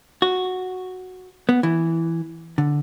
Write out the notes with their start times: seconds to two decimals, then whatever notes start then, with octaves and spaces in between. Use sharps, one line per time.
0.22 F#4
1.49 B3
1.63 E3
2.58 D3